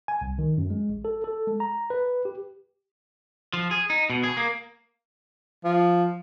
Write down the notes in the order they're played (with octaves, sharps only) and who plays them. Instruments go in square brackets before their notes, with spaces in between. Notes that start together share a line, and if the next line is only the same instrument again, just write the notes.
[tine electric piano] G#5
C2
D#3
F#2
G#3
A1
A4
A4
G#3
A#5
B4
G4
[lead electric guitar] F3
G#4
D#4
B2
G#4
A#3
[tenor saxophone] F3